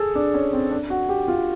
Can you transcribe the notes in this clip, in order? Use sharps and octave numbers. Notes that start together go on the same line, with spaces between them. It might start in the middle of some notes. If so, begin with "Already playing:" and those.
Already playing: G#4 A4
D4
C#4
C4
D4
F#4
G4
F4